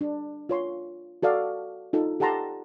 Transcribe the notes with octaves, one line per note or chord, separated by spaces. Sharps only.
D4
F4 C#5 C6
F#4 A4 D5 F5
D#4 F4 A4
G4 A4 F#5 A5 A#5 C6